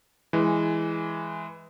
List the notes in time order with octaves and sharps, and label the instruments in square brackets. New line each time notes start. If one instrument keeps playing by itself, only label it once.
[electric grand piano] E3 G#3